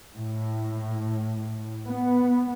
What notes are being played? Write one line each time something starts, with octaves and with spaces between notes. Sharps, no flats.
A2
B3